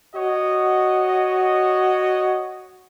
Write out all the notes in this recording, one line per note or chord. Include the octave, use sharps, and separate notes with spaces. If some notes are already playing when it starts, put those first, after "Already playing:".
F#4 C#5 D#5